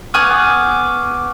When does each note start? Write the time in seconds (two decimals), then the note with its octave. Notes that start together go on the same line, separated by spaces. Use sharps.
0.14 B3 G#4 C#6 D6 F6 F#6